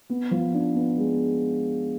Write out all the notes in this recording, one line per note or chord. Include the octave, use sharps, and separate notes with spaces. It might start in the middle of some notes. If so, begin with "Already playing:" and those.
B3
F3
D4
B3
G#3